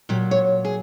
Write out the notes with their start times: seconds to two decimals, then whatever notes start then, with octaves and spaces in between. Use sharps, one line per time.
0.09 A#2 F#3 G4
0.31 C#5
0.65 G#4